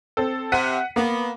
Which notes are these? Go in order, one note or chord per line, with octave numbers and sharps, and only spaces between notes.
C4 A4
C3 F#5 B6 D#7
A#3 B3